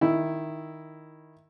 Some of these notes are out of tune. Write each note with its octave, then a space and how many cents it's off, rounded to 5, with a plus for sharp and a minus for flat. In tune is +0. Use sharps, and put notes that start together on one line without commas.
D#3 +0 E4 +0